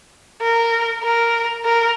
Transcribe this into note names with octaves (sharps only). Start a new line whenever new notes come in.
A#4
A#4
A#4